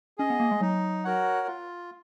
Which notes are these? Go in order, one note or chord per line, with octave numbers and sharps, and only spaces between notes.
C#4 G#4 D#5
B3
A#3
G#3
F#3 D#4
F#4 A#4 C#5 F#5
F4